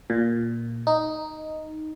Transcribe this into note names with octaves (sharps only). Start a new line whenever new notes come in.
A#2
D#4